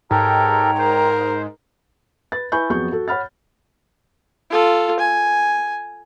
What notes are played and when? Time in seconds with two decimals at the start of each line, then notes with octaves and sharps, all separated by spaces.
0.11 G#2 G4 A4 A#4 C#5 G5 A#5
0.79 A#4 C5
2.32 B4 A6
2.52 E4 B4 G#5 B5 C#6 G6
2.70 F2 F#3 B3 G#4 C#6 G6
2.92 F#4 A4
3.08 C#5 F#5 B5 F6 A6
4.50 F4 A4
5.00 G#5